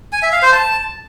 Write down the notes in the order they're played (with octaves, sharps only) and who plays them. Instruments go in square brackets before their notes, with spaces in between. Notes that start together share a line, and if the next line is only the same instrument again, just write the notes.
[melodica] G#5
E5
F5
C5
A5